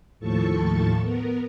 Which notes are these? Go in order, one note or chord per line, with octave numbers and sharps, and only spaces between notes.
D#2 A2 F3 A4 A5 C#6
B3 A#4